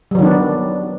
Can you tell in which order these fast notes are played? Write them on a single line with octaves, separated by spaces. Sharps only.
G3 F#3 D#3 D4 B3